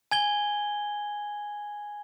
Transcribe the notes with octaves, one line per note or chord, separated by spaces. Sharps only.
G#5 G#6 G7